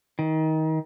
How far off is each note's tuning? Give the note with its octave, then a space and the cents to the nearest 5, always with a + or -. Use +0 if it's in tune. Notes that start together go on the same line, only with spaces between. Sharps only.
D#3 +25